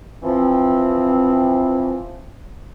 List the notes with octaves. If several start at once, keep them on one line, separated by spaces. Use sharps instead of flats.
E3 F3 C4